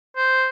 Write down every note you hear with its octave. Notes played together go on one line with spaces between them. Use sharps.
C5